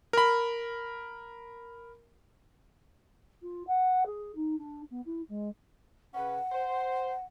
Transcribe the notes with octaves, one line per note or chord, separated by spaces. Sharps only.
A#4 B5
F4
F#5
G#4
D#4
D4
B3
E4
G#3
C#3 C#4 B4 F#5
C5